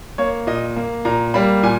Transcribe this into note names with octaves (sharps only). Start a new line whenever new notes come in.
A#3 C#5
A#2 D#5
A#3
A#2 A#5
G3 A#3 B5
A#2 G#5